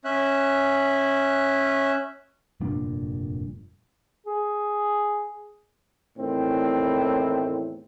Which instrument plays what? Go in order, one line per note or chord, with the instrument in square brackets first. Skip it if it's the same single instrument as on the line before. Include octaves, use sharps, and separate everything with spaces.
[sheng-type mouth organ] C#4 E5 F#6
[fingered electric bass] F1 G2 A#2 D4
[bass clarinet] G#4
[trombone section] E2 A2 D#3 C4